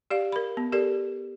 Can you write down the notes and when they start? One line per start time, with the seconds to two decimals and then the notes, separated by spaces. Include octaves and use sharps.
0.11 G4 D5 F5
0.32 A#4 B5
0.57 B3
0.72 G4 A4 A#4 D5